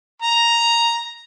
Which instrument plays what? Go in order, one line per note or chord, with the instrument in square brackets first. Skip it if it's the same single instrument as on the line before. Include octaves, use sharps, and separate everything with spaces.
[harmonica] A#5